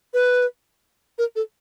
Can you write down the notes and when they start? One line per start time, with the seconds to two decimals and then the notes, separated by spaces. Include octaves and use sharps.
0.14 B4
1.19 A#4
1.36 A4